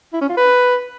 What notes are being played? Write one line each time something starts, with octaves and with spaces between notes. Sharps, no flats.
E4
C#4
F4
B4